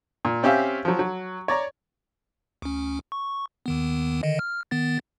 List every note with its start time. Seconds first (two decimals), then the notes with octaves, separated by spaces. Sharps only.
0.25 A#2
0.43 C4 C#4 G4 E5 F5
0.85 F3 F#3
0.99 F#3
1.48 C#5 D5 A#5
2.62 D2 C#4
3.12 C#6
3.66 D#2 D#3 B3
4.23 D3 D#3 D#5
4.39 F6
4.71 D#3 B3 A6